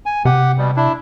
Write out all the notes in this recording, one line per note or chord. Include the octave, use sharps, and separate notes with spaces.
G#5
C3 G4 F#5
B2 G3
D4 E4